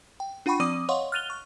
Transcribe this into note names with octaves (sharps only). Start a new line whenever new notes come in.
G5
D4 F4 F#5 G5 B5 C#6
F3 C4 D5 D6 D#6 D#7
C#5 D#5 F5 F#5 C6 C#6
F6 F#6 A6 D#7 F7 G7
C#6